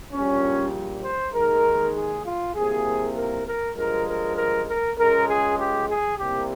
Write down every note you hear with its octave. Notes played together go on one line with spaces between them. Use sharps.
A#1 A#2 G3 C#4
C5
D#2 D#3 G#3 A#4
G#4
F4
C2 C3 F3 A#3 G#4
A#4
A#4
G2 F3 G#3 A#4
A#4
A#4
A#4
C#2 C#3 G#3 A#4
G#4
G4
G#4
C2 C3 G3 A#3 G4